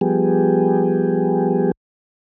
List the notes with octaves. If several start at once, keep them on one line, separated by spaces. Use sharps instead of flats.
F3 G3 B3 G4 G#4